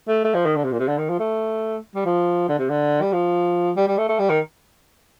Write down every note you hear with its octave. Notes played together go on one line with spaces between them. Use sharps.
A3
A3
F3
D#3
D3
C3
A#2
C3
D3
D#3
F3
A3
G3
F3
D3
C3
D3
G3
F3
G3
G3
A3
A3
G3
D#3